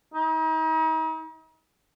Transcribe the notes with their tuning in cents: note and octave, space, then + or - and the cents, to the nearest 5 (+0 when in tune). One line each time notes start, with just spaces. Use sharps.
D#4 +40